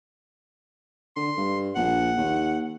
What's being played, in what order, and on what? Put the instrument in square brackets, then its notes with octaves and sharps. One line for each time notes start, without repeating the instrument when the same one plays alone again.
[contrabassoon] D3 [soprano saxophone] C6
[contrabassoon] G2
[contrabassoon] A#1 [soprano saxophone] F#5
[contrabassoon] D#2